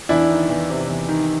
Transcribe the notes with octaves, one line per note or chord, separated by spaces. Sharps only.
E2 D4 E4
D#3
E2
C3
E2
D#3